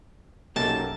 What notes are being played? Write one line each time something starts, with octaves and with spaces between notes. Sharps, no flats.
B1 F#2 A#3 D#4 G4 A5